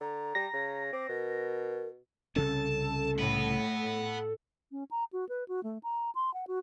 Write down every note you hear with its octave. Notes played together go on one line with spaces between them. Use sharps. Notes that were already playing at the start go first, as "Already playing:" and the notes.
D3 A#5
G3 A#6
C#3
C4 D6
B2 A#4
C2 C#3 C#4 A4 A5
A2 F#5 B5
C#4
A#5
F#4
B4
F#4
A3
A#5
C6
F#5
F#4